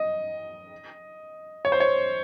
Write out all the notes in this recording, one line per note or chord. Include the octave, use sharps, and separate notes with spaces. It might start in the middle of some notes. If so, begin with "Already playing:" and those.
Already playing: D#5
C#5
C5
C#5